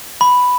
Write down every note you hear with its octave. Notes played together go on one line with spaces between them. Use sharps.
B5